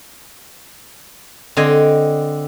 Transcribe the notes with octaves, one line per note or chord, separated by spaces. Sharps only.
D3 C4 D#5 G#5